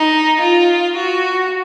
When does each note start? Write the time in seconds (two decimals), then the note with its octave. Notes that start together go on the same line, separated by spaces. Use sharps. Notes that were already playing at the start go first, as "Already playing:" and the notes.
Already playing: D#4
0.41 F4
0.96 F#4